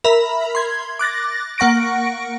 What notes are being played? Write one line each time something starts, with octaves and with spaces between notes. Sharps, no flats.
A#4 E5 B5
C6 G#6
D6 F#6 A6 A#6
A#3 F#5 C#6 A#6 D7